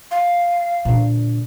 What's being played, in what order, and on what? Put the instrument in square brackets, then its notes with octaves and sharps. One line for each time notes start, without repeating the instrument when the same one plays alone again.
[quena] F5
[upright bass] A#2 D3